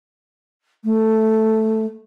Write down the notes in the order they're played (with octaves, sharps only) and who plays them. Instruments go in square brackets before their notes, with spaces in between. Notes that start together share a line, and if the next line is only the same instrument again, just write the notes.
[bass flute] A3